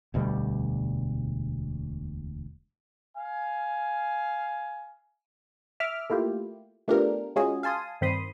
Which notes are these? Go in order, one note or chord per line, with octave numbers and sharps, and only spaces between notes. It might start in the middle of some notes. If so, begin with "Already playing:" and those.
E1 D2 B2 G3
F5 G#5
E5 D6 F6
A3 A#3 E4 F4 G4
A3 B3 D4 F4 G4 A#4
G#3 C#4 F4 F#4 G#4 D#5
F5 G#5 A5 C6 D#6
G2 D#3 C4 B5 C6 D#6